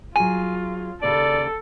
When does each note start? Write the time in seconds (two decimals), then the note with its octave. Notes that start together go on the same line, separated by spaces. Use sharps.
0.16 F#3 F4 G#4 G#5
1.02 D#2 C#3 G4 A4 D5